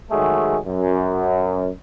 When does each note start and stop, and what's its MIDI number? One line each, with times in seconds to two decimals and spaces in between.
0.11 0.58 51
0.11 0.58 54
0.11 0.58 56
0.11 0.58 57
0.11 0.58 68
0.11 0.58 69
0.66 1.68 42